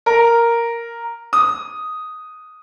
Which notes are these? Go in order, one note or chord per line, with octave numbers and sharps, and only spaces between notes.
A#4
D#6